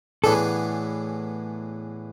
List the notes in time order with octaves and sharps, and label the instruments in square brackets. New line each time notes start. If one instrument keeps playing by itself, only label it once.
[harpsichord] A2 E3 B3 D4 G#4 [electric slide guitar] A4